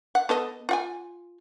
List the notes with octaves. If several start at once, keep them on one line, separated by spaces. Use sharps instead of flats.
F#5
B3 A4 D#5
F4 F#5 G#5